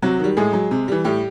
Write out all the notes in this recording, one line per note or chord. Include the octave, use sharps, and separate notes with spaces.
C3 F#3 F#4
D#3 G3
A2 G#3 G#4
F#3
C3
E3 G3
A2 G3 G4